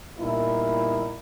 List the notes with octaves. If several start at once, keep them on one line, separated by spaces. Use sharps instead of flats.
A#2 G3 B3 D#4 E4 A#4